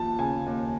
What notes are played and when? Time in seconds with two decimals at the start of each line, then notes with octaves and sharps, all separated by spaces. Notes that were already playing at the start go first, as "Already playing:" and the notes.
Already playing: D#2 F3 A5
0.19 C#3 G#5
0.46 D#2